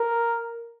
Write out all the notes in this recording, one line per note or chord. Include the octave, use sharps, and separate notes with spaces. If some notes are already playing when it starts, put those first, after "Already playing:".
Already playing: A#4